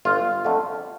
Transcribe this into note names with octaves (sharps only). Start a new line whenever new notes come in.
G1 F4
F2 D3 A3